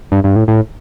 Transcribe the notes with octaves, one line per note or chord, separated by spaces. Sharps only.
G2
G2
A2
A2